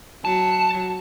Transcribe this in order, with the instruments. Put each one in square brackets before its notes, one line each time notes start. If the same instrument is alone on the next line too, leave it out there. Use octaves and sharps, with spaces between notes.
[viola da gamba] F#3 [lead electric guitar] A5